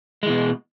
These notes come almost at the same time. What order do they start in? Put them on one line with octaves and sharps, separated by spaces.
G#3 E3 B2